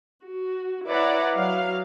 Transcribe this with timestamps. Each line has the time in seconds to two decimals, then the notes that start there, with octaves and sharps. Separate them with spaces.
0.24 F#4
0.86 E4 B4 C#5 D5 F#5 A#5
1.36 F#3 F5